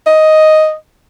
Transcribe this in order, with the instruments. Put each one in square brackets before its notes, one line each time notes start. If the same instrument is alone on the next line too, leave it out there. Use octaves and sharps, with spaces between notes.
[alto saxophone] D#5